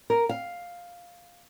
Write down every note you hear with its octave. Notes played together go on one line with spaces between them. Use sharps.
A#4
F5